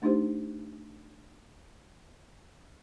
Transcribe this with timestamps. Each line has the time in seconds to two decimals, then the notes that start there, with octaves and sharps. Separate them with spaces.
0.02 A3 D4 D#4 F4 G4 C5